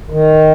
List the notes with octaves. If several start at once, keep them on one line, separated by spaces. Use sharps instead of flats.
D#3